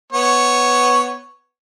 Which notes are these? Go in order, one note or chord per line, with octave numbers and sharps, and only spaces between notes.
B3 C#5